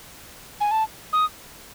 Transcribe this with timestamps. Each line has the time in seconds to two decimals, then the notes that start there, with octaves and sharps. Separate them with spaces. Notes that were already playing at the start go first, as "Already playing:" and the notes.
0.61 G#5
0.71 A5
1.13 D#6